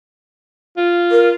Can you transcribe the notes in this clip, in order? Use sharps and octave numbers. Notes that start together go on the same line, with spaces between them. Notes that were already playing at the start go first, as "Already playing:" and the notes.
F4
A#4